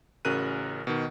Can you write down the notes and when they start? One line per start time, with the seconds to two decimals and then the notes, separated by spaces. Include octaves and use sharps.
0.25 A1 C#3 F#4 A#4 F#6 D#7
0.87 B2 D#3